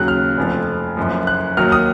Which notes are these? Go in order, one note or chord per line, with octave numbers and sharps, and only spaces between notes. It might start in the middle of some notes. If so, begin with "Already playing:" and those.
Already playing: D#2 C#3 F#3 F#6
F6
F1 F2 F3
F#1 F#2 F3
F#6
D#2 D#3 F#3 F6
D#6